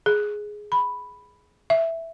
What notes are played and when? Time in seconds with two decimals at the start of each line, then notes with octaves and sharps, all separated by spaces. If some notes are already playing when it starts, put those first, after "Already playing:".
0.06 G#4
0.72 B5
1.70 E5